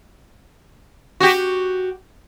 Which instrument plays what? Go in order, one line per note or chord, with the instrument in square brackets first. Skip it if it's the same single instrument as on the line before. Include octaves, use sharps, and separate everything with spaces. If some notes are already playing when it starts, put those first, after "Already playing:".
[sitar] F#4 G4